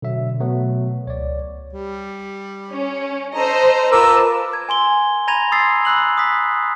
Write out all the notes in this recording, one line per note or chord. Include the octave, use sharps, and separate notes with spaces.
B2 D3 F#3 E5
F#3 A3 B3
C#2 C#5 D5
G3
C#4
A4 C5 D#5 A#5
F4 A#4 B4 A5 D6 E6
G#6
G#5 C6 G7
A#5 B5 G#6 A#6 D#7 F7
C6 D#6 E6 A6 C7
B5 E6 F#6 F#7
D#6 B6